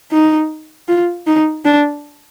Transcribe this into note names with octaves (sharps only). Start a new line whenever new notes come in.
D#4
F4
D#4
D4